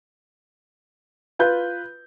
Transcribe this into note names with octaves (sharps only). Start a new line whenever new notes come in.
F4 B4 G6